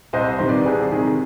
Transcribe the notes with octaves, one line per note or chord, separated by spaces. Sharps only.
C2 C5 D#5
C3 D#3 C5
B4 D5
C2 G#4 C5
C3 D#3 G#4